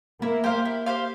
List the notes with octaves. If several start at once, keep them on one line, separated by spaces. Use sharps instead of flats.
A#3 E4
G4 C5 F5
E4
G4 C5 F5